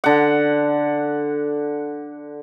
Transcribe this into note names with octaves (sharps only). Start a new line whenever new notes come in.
D3 F#5